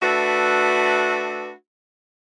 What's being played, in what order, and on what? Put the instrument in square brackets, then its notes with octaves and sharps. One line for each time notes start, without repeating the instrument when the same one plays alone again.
[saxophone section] A3 D4 F#4 B4 E5